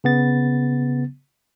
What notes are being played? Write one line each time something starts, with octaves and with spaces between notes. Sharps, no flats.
C#3 B3 A6